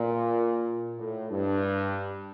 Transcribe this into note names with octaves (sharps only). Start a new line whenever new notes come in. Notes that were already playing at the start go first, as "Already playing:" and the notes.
Already playing: A#2
A2
G2